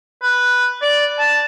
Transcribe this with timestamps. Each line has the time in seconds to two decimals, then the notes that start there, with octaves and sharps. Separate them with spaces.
0.22 B4
0.82 D5
1.19 A5